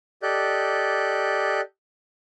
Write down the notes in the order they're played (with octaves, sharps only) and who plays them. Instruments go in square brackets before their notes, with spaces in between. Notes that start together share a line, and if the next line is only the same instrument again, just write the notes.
[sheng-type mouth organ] G4 A4 D5 D#5 F#6 G6